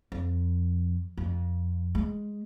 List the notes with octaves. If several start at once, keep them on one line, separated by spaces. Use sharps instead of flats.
F2
F2
G#3